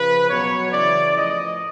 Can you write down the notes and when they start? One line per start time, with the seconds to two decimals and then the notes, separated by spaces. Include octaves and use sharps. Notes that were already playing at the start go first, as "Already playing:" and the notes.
Already playing: C#3 F3 B4
0.30 B2 F#3 C#5
0.72 C#3 E3 D5
1.16 A2 F3 D#5